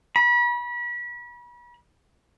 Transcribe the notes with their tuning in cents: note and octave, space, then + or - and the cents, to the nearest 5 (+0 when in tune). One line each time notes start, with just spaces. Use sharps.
B5 -35